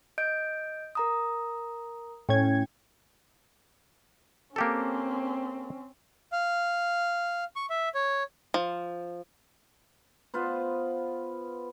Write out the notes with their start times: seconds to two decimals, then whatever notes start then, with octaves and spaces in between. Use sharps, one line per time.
0.18 D#5 G6 D7
0.95 A#4 A#5 D#6
2.29 A2 C#4 G5 G#6
4.56 A#3 C4 C#4 G4 A4
6.32 F5
7.56 C#6
7.70 E5
7.94 C#5
8.54 F3
10.34 B3 F4 B4 C5